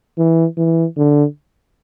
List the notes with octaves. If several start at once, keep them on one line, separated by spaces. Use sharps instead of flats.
E3
E3
D3